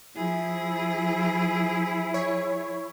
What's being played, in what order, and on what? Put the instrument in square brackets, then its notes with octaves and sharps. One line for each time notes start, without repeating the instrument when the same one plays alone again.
[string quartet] F3 G#4 [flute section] E4
[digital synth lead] C#5